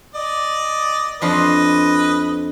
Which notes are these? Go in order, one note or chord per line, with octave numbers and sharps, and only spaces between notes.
D5 D#5
F2 F3 D4 B4 D#5